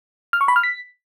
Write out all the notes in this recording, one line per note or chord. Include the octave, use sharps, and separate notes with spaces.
F6
C#6
B5
F6
B6